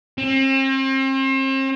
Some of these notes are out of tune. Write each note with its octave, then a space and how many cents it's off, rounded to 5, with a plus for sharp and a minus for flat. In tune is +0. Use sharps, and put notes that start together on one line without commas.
C4 +40